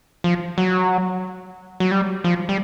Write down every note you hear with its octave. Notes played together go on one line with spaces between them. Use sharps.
F3
F#3
F#3
G3
F3
G3